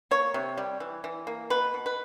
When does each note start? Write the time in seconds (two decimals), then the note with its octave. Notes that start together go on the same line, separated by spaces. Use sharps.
0.11 A#3 C#5
0.34 C3
0.57 G3
0.80 E3
1.04 E3
1.27 A#3
1.50 B2 B4
1.74 B2
1.86 B4